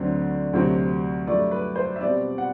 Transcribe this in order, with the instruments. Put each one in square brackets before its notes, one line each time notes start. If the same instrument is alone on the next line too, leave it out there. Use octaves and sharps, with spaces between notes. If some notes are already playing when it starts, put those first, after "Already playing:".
Already playing: [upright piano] D2 D3 F#3 C4
D2 C3 F#3 C4
G2 F#3 A3 D5
B4
C5
E5
B2 G3 C4 D5
F#5